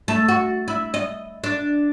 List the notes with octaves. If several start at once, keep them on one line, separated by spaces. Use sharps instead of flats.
A3
F#4
E4
D#5
D4